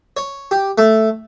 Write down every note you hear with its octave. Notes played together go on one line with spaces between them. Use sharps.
C#5
G4
A3